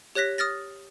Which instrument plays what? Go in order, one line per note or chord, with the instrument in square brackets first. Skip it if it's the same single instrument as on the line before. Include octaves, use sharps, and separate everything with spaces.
[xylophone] G4 C#5 F#6 A#6 B6
D#6 F6 A6 A#6